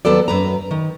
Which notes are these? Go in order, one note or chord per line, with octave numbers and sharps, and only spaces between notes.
D#2 F#3 B3 A4 D5
F#2 B4 A#5
D#3